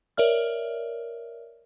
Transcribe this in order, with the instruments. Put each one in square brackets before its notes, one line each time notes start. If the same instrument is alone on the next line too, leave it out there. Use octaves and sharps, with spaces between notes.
[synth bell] A#4 C#5 D5 E5 F6